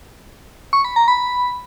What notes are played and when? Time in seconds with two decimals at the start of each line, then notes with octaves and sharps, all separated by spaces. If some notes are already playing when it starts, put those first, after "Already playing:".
0.73 C#6
0.85 B5
0.96 A#5
1.08 B5